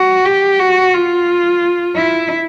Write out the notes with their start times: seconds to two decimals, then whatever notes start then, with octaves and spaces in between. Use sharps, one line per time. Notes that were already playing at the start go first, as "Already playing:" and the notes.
Already playing: F#4
0.25 G4
0.59 F#4
0.93 F4
1.96 E4